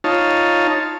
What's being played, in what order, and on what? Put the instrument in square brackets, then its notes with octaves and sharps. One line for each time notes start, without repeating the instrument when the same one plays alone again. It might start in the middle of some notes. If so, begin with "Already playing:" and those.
[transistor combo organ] D#4 F4 C#5 A5